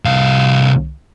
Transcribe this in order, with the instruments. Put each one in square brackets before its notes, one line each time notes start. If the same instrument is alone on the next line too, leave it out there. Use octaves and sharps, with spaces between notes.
[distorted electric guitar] C2 F5